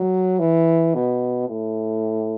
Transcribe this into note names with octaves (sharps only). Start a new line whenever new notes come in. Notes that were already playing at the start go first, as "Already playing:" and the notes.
Already playing: F#3
E3
B2
A2